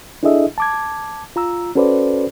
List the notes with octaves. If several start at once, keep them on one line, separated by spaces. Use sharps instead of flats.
D4 E4 G#4 A4 D#5 E5
A5 D6 G#6
F4 A#5 E6
C#4 F#4 A4 B4 C5 D5